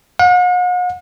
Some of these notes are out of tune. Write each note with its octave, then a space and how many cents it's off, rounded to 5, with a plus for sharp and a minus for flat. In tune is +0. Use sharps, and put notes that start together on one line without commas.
F#5 -45